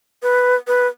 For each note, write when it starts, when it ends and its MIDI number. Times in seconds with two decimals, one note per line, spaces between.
0.23 0.55 71
0.67 0.87 71